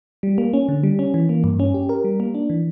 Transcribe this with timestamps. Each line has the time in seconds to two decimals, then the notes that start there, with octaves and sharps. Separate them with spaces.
0.23 G3
0.38 A#3
0.53 C#4
0.69 D3
0.83 G3
0.99 C#4
1.14 E3
1.29 A#3
1.44 G2
1.60 C#4
1.74 G4
1.89 A#4
2.04 G3
2.20 A#3
2.35 D4
2.50 E3